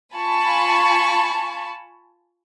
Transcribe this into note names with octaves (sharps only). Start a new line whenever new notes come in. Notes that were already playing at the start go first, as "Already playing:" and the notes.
F4 G#5 A5 B5 C#6